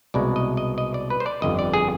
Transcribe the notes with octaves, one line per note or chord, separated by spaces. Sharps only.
C2 B2 G#3 D5
D#5
D#5
D#5
D5
B4
C5
D5
G1 F2 D3 D#5
D5
G#4